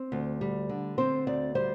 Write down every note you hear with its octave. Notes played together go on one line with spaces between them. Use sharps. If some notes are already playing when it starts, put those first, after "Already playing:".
Already playing: C4
D2
G3
D3
C4 C5
D2 D5
G3 C5